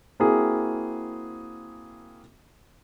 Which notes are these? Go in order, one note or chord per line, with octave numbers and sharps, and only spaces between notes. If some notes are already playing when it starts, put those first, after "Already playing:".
A#3 C4 E4 F#4 G#4